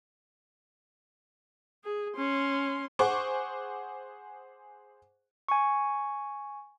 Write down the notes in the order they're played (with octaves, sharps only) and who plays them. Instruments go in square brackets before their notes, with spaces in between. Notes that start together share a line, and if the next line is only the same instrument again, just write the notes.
[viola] G#4
C#4 C6
[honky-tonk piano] G#4 C5 F#5 C#6 D6
[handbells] G#5 C#6